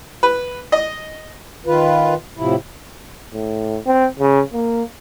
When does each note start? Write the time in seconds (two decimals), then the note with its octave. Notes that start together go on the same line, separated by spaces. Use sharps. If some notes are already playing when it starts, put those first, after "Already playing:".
0.23 B4
0.72 D#5
1.66 D#3 F4 B4
2.37 A2 C3 F3 E4
3.34 A2
3.87 C4
4.20 C#3
4.54 A#3